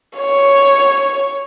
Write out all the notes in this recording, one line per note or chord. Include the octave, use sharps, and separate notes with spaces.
C#5